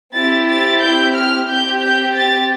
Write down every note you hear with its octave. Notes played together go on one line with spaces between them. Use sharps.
C4 E4 G4 A6
A6
G6
F6
C4 G4 G6
G6
A6